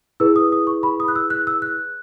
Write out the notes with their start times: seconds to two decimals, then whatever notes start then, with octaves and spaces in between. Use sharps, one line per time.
0.20 E4 G#4 B4 E6
0.36 D#6
0.52 D#6
0.67 C#6
0.83 B5
1.00 D#6
1.08 F#6
1.16 E6
1.30 F#6
1.47 E6
1.62 F#6